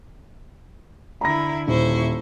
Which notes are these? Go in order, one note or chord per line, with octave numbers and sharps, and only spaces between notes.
D3 E4 A#5 B5 A#6
D#1 E4 C5 C#6